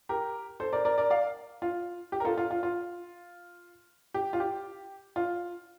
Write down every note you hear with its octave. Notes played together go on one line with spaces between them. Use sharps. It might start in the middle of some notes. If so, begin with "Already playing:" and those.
G4 A#4
A4 C5
A#4 D5
A#4 D5
A#4 D5
D5 F5
F4
G4
A#4
F4 A4
F4
F4
F4
G4
F4
G4
F4